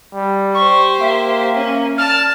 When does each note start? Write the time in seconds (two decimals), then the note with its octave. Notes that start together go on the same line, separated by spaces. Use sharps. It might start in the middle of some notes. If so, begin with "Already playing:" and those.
0.14 G3
0.54 G4 C5 C#6
1.00 A#3 E5
1.55 C#4
1.98 D5 A5 F6